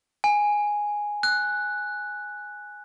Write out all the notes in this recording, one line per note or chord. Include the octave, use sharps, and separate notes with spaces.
G#5
F#6